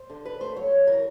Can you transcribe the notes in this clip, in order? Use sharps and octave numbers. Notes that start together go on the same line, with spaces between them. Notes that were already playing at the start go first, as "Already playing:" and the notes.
Already playing: C5
D3
G2 B4
A3 C5
F#3 C#5
F#2
E3 A#4